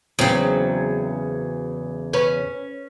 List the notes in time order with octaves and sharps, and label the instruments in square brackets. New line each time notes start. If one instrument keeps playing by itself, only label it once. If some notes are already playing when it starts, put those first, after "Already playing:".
[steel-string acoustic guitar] E2 C#3 [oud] F#3 C4
[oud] C#4 B4